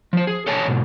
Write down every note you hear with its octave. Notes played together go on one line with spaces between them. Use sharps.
F3 C5
G#4
A4 C#5 G#5 A5
G#2 B2